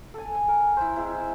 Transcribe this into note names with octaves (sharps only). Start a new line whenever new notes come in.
A4 G#5
G#5
A#4
E4 C5
G#3 C4 E4